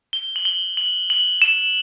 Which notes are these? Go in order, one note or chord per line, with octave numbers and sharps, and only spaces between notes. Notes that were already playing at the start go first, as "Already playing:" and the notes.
G7
F#7
G7
F#7
F#7
E7